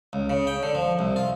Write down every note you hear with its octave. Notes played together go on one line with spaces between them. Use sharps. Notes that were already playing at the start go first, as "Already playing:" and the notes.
C#2
C#3
G5
D3
F3
C2
F4